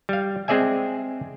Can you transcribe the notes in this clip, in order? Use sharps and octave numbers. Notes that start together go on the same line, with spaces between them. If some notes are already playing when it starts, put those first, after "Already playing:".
G3 F5
G#3 C4 G#4 D5 E5 G#5